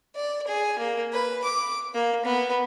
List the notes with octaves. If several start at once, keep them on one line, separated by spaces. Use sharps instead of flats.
D5
G#4
A#3
B4
D6
A#3
B3